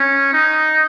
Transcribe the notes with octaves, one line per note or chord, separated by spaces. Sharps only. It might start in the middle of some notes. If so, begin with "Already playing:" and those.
Already playing: C#4
D#4